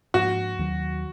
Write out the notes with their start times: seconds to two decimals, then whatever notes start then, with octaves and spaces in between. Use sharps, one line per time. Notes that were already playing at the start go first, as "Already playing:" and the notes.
0.14 G#2 F3 A#3 D4 F#4
0.59 D#2 D#3 F#3